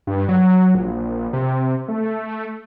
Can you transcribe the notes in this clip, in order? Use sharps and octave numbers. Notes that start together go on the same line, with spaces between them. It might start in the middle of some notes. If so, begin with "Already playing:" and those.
G2
F#3
A#1
C3
A3